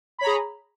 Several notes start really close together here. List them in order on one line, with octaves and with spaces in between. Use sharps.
B5 C#5 A#5 G#4